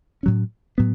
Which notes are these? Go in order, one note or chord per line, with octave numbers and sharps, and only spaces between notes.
A2 F#3 C#4
A2 F#3 B3